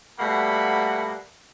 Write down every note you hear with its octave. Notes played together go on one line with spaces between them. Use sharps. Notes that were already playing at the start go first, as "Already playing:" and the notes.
B2 G3 A3 A#3 F#5 B5